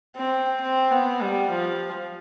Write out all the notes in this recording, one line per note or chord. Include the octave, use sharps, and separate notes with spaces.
C4
C4
B3
G3
F3